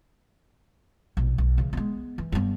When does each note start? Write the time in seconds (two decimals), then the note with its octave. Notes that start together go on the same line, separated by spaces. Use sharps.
1.17 A#1 B2
1.38 B1
1.58 C#3 E3
1.73 G#3 B3
2.18 E3
2.32 G2 B3